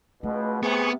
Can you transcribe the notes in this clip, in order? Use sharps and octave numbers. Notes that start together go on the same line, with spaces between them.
C#2 B2 A3
C3 B3 G#4 C#6